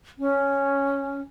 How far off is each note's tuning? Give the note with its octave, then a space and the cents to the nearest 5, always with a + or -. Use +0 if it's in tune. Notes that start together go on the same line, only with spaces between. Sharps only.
C#4 +0